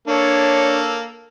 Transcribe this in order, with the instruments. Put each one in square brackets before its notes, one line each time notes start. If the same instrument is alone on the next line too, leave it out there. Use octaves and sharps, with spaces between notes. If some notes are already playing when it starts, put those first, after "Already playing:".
[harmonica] A#3 A4 [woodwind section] D4 C#5